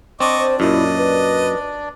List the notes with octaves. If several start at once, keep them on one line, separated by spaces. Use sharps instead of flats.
C4 D4 D5 D#5 C#6 D6
C5
F#2 A#2 E4 D#5
B4